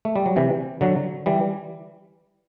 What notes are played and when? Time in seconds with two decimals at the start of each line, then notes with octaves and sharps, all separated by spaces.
0.05 A3
0.16 G3
0.26 F#3
0.36 C3 E3
0.81 D3 F#3
1.26 E3 G3